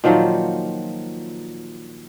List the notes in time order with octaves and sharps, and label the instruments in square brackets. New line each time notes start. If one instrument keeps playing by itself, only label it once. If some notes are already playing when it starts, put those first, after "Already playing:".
[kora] A#2 D#3 F3 F#3